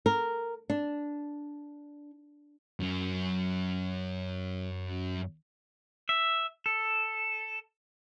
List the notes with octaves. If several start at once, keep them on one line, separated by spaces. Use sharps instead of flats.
A#4
D4
F#2 C#4
E5
A4